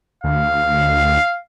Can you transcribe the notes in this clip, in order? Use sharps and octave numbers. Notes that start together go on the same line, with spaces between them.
D2 F5